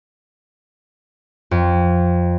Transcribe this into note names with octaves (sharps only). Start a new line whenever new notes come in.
F2